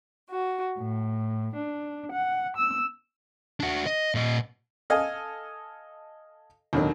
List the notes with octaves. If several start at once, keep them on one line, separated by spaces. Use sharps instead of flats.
F#4
A2
D4
F#5
E6
D4 F#4
D#5
A#2 D#5
A4 D#5 F5 G#5
D#2 B2 D3 D#3 F#3